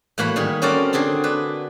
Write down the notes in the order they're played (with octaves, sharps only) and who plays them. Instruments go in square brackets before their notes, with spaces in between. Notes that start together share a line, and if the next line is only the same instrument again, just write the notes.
[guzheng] A2 E3 A#3 F#4 F#5 B5
D#3 G3 G#4
C4 C#4 F#4 A4 A#4 D5
D3 C4 G#4 A4
D4 B4